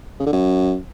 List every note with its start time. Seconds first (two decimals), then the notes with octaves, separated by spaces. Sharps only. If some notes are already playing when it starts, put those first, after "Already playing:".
0.20 C#3
0.26 D3
0.33 F#2